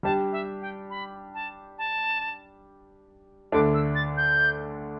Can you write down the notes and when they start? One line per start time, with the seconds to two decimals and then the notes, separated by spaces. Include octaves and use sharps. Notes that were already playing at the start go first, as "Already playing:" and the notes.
0.03 G3 D4 G4 A5
0.32 E5
0.62 G5
0.90 B5
1.34 A5
1.78 A5
3.52 D2 D3 A3 D4 D6
3.74 E6
3.95 A6
4.17 G6